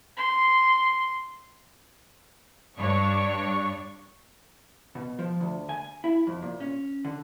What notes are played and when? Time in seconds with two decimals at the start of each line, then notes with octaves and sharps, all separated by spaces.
0.17 C6
2.78 G2 D4 C#5 C#6
4.95 B2
5.19 F3
5.40 D2
5.69 G#5
6.04 E4
6.27 F2
6.42 A#2
6.60 C#4
7.05 D3